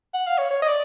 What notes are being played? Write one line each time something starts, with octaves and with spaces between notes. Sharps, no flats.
F#5
F5
C#5
C#5
D#5
D5